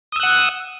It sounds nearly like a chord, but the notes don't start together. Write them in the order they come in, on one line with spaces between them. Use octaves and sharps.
D#6 E6 F#6 F#5